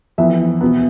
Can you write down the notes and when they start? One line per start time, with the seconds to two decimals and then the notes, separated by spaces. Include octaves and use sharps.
0.18 F2 E3 B3 E5
0.61 B2 B3